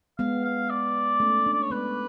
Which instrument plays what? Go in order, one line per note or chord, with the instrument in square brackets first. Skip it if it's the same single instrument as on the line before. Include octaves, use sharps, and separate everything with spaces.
[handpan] G#3 B3 [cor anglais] F5
[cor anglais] F5
D5
[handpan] A3 C#4
B3 D4
[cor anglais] D5
C#5
[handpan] G#3 B3 [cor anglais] B4